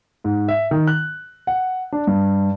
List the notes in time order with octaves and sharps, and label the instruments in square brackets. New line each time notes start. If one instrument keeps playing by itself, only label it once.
[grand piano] G#2
E5
D#3
F#6
F#5
D4
G2